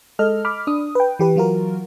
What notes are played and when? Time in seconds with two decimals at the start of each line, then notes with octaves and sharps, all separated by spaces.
0.19 G#3 A4 D#5 F6
0.45 B5 D6 F6
0.67 D4 D#6
0.95 B4 G5
1.19 E3 G4 B4
1.36 E3 F#3 F4 F#4 A#4